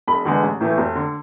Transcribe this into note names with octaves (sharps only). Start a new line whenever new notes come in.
E1 B5
E2 D3 G#3 B3
A1
A2 E3 A3
F1
D3